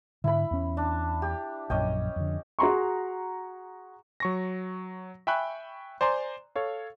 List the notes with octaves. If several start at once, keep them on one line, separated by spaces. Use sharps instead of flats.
G#2 D3 E4 B5
E2 C#4
D4
G4
A#1 F#2 C#4 D#5 G5
F2 D3
F#4 G#4 A#5 C6 C#6
F#3 C#6 A#6
E5 G5 G#5 B5 C#6 F#6
C5 D5 G#5 A#5 C6
A4 C#5 F5